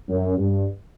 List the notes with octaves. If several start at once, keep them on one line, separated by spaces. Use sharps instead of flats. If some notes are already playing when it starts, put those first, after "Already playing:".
F#2
G2